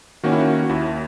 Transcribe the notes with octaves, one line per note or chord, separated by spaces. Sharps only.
D#3 A#3 C#4 F#4
E4
F#4
F#4
D#2 E4